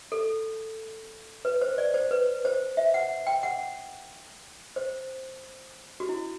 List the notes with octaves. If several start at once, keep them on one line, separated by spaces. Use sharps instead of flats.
A4
B4
C5
D5
C5
B4
C5
E5
F#5
G5
F#5
C5
F#4
E4